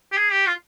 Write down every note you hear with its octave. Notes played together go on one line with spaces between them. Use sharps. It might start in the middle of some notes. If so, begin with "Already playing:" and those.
G4
G#4
G4
F4